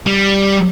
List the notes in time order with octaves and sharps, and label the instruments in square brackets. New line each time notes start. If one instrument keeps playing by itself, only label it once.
[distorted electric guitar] G3